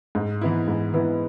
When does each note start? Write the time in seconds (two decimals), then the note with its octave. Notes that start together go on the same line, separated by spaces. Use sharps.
0.15 G#2
0.41 E3 B3 E4
0.68 G#2
0.94 E3 B3 E4